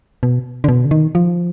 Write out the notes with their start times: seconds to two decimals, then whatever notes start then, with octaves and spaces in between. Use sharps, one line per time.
0.23 B2
0.64 D3
0.68 B2
0.85 D3
0.91 D#3
1.15 F3